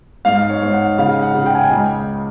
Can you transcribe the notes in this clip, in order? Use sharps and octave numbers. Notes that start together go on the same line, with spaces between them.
G#2 F5
C#5
G#2
F#5
C#3 F5
F#5
C#3
G5
G#5
G5
C#2